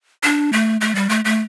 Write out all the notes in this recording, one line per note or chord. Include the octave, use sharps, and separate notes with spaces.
D4
A3
A3
G3
A3
A3